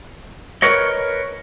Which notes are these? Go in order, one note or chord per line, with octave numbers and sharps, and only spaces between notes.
A#4 B4 C#5 D#5